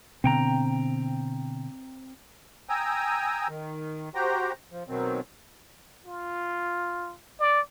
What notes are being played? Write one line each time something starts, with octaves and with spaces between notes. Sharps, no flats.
B2 D3 B3 C4 G5 A#5
G5 G#5 A#5 D#6 E6
D#3
F#4 G4 C5 G5 A#5
F3
B2 D#3 F#3 C4
F4
D5